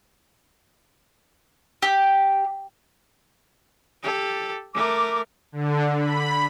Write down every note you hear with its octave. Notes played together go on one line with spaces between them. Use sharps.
G4
G4 A4
A3 A#4 D6
D3
B5